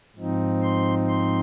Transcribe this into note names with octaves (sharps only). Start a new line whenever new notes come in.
G#2 F3 C4 D#4
C6
C6